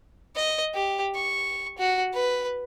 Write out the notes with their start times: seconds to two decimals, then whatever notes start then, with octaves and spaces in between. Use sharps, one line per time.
0.36 D#5
0.74 G4
1.15 C#6
1.78 F#4
2.14 B4